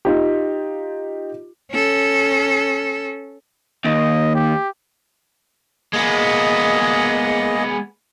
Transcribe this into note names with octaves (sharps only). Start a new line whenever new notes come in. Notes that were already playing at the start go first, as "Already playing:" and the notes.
D#4 F4 G4
C#4 A4
D#2 D#5
G4
G#3 A#3 B3 G#4 D#5